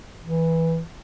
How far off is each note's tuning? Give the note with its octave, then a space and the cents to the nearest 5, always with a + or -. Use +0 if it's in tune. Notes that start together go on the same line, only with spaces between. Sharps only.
E3 -5